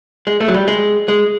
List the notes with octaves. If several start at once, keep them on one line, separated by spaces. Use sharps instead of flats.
G#3
A3
F#3
G3
G#3
G#3